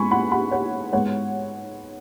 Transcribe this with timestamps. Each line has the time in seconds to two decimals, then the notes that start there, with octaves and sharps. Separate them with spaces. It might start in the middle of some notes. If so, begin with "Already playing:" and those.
Already playing: G#2 G#3 B3 G#5 B5 C#6
0.11 F#5 B5
0.32 F#5 B5
0.51 C#5 F#5
0.93 G#2 G#3 B3 C#5 F#5